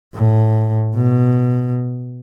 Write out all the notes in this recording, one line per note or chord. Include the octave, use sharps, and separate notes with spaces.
A2
B2